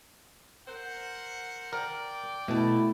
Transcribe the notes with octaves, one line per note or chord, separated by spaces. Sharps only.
A#4 C5 F#5
A#4 D5 G5
B2 A3 E4 A5